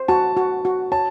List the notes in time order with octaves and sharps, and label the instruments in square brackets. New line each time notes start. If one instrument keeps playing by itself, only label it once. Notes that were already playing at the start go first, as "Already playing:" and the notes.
Already playing: [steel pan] C5
[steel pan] F#4 [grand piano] A5
[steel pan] F#4
F#4
[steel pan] C#5 [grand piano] A5